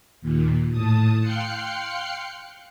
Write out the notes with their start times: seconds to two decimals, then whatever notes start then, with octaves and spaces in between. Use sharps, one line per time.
0.22 D#2 A#2
0.71 A2 A5 D#6
1.21 F5 G5 C6 F#6 C7 C#7